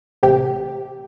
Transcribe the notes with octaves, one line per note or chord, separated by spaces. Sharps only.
A1 C3 G4